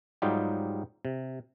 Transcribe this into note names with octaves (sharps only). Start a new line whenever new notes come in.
G#2 F#3 G3 D#4 F4 G4
C3